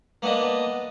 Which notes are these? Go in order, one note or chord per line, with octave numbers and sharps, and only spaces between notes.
A#3 B3 D4 D#5